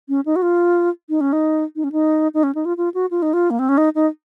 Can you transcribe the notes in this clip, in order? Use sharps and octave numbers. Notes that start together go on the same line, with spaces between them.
C#4
D#4
F#4
F4
D#4
C#4
D#4
D#4
C#4
D#4
D#4
C#4
D#4
F4
F4
F#4
F4
D#4
F4
A#3
C4
C#4
D#4
D#4